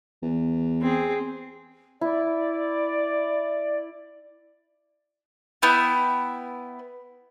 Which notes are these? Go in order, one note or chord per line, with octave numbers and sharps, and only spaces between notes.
E2
C4 G#4
E4 D5
B3 E4 G5